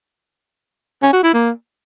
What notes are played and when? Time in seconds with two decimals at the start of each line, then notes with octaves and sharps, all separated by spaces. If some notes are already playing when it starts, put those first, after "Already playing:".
1.02 C#4
1.13 F#4
1.23 E4
1.34 A#3